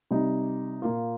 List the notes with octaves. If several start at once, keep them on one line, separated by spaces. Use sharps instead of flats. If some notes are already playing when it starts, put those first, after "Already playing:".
C3 G3 D#4
A#2 A#3 F4